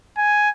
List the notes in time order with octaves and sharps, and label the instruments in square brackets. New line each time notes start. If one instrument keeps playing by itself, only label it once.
[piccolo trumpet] G#5